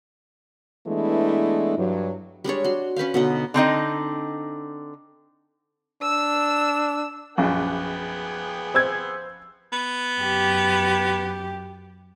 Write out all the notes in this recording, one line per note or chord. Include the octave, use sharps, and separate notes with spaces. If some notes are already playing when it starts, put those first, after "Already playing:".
E3 G#3 A3 B3 D4 E4
G2 F#3
G3 G#3 D4 C#5
F#4 C6
C#4 B4 C5 F5
B2 D3 D#4
D3 C4 D#4 D#5
D4 E6 E7
A#1 F#2 B3 G#4 G5
C5 E6 G#6
B3
F#2 G4